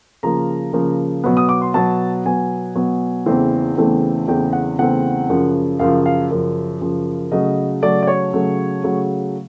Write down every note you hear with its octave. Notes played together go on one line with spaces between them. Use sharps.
C#3 F3 A#3 A#5
C#3 F3 A#3
B2 F#3 B3
D#6
D6
C6
B2 F#3 B3 A5
B2 F#3 B3 G#5
B2 F#3 B3
E2 C#3 E3 A3 C4
E2 C#3 E3 A3 C4
E2 C#3 E3 A3 C4 G5
F#5
E2 C#3 E3 A3 C4 F#5
F#2 C#3 F3
F#2 C#3 F3 F5
F5
F#2 C#3 F3
F#2 C#3 F3
C#3 F#3 A3 D#5
C#3 F#3 A3 D5
D5
C#5
C#3 F#3 A3
C#3 F#3 A3